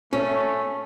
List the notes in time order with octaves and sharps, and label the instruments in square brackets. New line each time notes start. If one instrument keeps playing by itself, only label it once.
[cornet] A3 [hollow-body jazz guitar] C#4